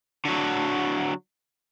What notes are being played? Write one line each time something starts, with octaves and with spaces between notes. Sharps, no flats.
D3 F#3